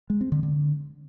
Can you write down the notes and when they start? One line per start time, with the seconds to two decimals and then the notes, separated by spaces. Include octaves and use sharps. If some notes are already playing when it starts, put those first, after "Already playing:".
0.10 G#3
0.21 C4
0.32 D3
0.43 D3